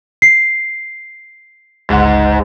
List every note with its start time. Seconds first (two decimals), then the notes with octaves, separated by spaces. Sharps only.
0.22 C7
1.90 G1 C#2 G#2 F#5